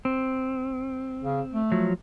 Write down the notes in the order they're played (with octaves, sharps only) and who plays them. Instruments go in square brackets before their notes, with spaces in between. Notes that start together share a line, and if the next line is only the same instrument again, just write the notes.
[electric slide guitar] C4
[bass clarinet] C#3
A3
[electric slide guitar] F3 F#3